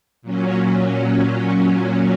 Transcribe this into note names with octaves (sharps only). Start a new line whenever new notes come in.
A#2 F#3 C#4